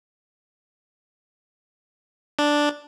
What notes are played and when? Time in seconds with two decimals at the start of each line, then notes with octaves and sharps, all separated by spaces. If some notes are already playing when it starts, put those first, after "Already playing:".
2.39 D4